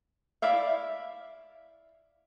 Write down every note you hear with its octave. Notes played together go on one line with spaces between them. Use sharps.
E4 D5 E5 F5